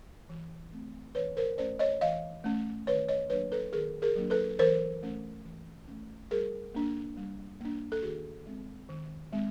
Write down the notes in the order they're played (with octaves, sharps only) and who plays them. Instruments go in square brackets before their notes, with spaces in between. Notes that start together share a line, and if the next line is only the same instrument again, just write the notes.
[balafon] E3
A3 C4
E3 B4 C#5
A#4 C5
A3 C#4 C5 D5
C#5 D#5
E3 D#5 F5
A3 C#4
D#3 B4 C#5
C#5 D#5
F#3 A#3 D4 B4 C#5
A4 B4
D#3 G#4 A#4
G#4 A#4
F#3 A#3 D4
A4 B4
E3 A#4 C5
A3 C#4
E3
A3 C#4
G3 G#4 A#4
A#3 D4
G3
A#3 D4
A4
D#3 F#4 G#4
G#3 C4
D#3
G#3 C4